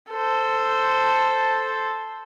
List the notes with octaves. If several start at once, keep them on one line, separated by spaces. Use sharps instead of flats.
A4 C5